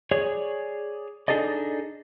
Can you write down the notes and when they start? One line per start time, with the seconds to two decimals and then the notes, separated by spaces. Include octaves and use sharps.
0.11 G#4 C#5 D5
1.28 D4 D#4 G#4 A4 D5 D#5